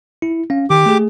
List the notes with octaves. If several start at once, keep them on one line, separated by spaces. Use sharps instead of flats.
E4
C#4 F5
D#3 G4 D6
A3 G#4